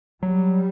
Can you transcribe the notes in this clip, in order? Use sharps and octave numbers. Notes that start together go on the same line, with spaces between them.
F#3 G3